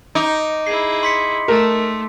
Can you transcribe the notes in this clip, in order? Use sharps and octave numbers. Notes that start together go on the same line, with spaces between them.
D#4 D6 D7
E4 G#4 C7
C6 B6 C#7
A3 A#4